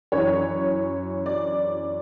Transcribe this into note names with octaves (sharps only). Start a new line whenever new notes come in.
F#2 E3 C#5
D5